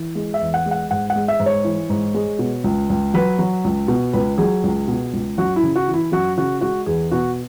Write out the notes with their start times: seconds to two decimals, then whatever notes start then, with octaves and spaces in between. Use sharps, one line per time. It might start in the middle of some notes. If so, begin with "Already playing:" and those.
Already playing: E3
0.15 G#3
0.34 E5
0.41 E2
0.54 F#5
0.66 G#3
0.71 F#5
0.91 G#2 F#5
1.10 F#5
1.16 G#3
1.28 E5
1.40 G#2
1.46 C#5
1.64 E3
1.90 G#2
2.15 G#3
2.39 B2
2.64 C#2
2.90 C#2
3.14 F#3 B4
3.39 F#3
3.64 C#2
3.88 B2
4.13 C#2 B4
4.38 F#3 G#4
4.63 C#2
4.88 B2
5.13 C#2
5.38 F#2 F#4
5.56 E4
5.63 C#3
5.76 F#4
5.88 E3
5.94 E4
6.12 F#2 F#4
6.38 C#3 F#4
6.61 G#3 F#4
6.86 E2 G#4
7.11 B2 F#4